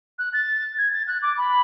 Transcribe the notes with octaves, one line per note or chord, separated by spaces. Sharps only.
F#6
A6
G#6
A6
F#6
D6
B5